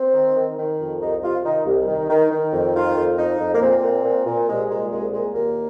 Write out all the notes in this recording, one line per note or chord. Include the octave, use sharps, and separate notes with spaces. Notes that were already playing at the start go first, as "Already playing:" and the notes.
Already playing: C4
D#3
D#3
D#3
F2
C2 D#4
C3 F4
D#3 D#4
C2
D#3
D#3
D#3
F2
D#3 F4
F2
F2 D#4
F2
A#3
A#2 C4
A#2
A#2
A#2
C2 G#3
A#2 G#3
C2 G#3
A#2 G#3
D#2 A#3